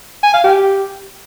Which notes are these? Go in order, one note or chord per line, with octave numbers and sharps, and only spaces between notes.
G#5
F5
G4